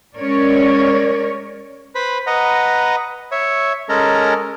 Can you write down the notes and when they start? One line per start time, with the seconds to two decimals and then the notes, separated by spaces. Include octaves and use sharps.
0.17 G#3 C#4 A#4 C#5 D5
1.95 B4 C5 B5
2.27 B4 D#5 F#5 A#5
3.32 C#5 E5
3.89 G#3 C#4 A4 A#4 A#5